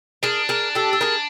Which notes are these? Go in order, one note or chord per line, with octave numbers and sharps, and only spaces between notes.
D4 G#4 A#4
G#4 A#4
G4 A4
A4
G#4 A#4